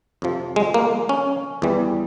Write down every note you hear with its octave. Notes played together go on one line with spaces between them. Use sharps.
F2 C3 F3
G#3
A#3
C#4
E2 E3 G3